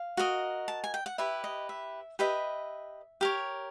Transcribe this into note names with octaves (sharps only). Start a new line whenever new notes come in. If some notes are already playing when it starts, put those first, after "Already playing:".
Already playing: F5
F#4 A#4 D#5
A5
G#5
G5
F#5
E4 G4 B4 E5
D#5
E5
G4 B4 D#5 E5
G4 A#4 C#5